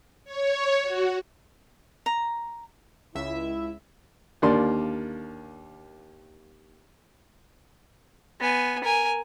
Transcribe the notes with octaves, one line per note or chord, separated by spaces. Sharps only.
C#5
F#4
A#5
C#2 E4 E5
D#2 D3 A#3 D5 C6
B3 G#5
A#4 G#5